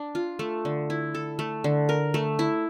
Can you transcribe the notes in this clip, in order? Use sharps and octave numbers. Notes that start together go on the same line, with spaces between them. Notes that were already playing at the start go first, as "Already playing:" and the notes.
Already playing: D4
F4
A3
D3
E4
A4
A3
D3
A#4
A3
E4